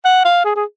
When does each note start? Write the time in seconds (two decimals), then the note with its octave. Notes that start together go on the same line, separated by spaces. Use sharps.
0.05 F#5
0.25 F5
0.45 G#4
0.56 G#4